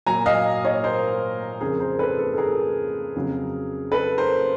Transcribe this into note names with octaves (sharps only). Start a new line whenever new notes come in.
A#2 F#3 G#5 A#5
D#5 F5
C#5 D#5
A#4 C5
F2 C#3 F3 G#4 A#4
A#4 C5
A4 B4
A4
A4
G#4 A#4
F2 C#3 F#3
A4 B4
A#4 C5